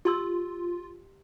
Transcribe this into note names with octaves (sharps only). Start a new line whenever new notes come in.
F4 G4 C6 E6